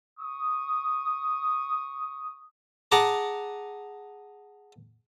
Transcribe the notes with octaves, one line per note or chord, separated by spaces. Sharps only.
C#6 D#6
G#4 F#5 A5 A#5 D6